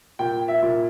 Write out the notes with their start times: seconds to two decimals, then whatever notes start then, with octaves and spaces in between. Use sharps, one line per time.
0.19 A#2 G5
0.48 E5
0.62 A#2